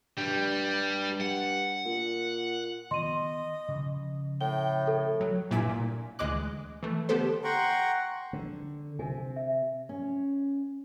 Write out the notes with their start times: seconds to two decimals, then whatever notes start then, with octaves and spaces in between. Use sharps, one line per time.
0.17 G2 G3
1.21 F#5
1.85 A#2
2.91 D#3 B3 D#5 C6 D#7
3.68 C#3 F3
4.41 A2 G5 G7
4.87 A4
5.21 F#3
5.51 G1 A#2 E4 G#5 D6 B6
5.69 A#2
6.19 D2 E3 G#3 D#5 D6 F#6
6.83 E3 A3
7.09 D3 B3 G4 A4 C5
7.44 F#5 G5 A#5 C6 C#6
8.33 D3
8.99 C3 G#5
9.36 E5
9.89 C#4